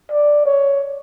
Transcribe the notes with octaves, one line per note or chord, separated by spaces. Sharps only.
D5
C#5